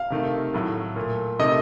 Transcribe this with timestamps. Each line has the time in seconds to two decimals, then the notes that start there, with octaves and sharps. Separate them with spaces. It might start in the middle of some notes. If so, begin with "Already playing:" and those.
Already playing: F5
0.10 C3 D#3 A3
0.54 A2 F#3 A3
0.96 A#2 A3
1.39 C3 D#3 A3 D#5